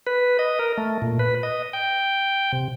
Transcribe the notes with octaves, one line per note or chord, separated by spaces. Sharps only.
B4
D#5
A#4
A3
A#2
B4
D#5
G5
C3